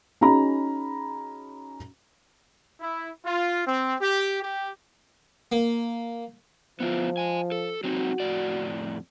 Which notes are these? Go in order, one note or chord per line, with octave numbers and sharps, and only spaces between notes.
C#4 D#4 F#4 G#4 A#5 B5
E4
F4
C4
G4
G4
A#3
F3 B3 E4 F4
D#5 G#5
A4
F#3 C4 D#4 F#4
F2 A2 D5